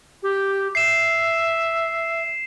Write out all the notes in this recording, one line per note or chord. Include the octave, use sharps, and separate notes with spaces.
G4
E5 C7 E7